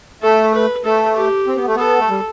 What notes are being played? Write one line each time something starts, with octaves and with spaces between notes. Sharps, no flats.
A3 A4
B4
A3 A4
G4
C4
B3
A3
B3 A4
A3
G3